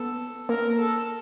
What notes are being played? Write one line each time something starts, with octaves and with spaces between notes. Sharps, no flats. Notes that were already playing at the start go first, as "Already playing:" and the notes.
Already playing: B3 A4
A#3 A#4
A4